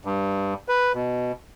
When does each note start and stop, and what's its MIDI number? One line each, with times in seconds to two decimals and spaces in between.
0.05 0.54 43
0.69 0.92 71
0.94 1.32 47